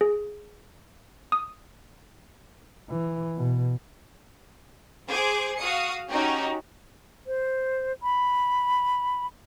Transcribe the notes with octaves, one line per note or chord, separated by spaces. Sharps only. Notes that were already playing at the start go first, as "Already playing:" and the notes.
G#4
D#6
E3
B2
G#4 C5 D6
F#4 F5 D#6 C#7
C#4 D#4 F#4 G4
C5
B5